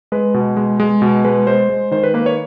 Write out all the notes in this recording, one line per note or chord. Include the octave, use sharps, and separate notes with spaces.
G#3 B4
B2
G#3
G#3
B2
G#3 B4
G#3 C5
G#3
D#3 C5
B4
A#3 B4
C#5